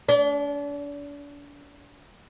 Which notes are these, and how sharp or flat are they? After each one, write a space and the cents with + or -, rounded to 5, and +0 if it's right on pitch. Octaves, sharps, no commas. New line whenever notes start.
D4 -40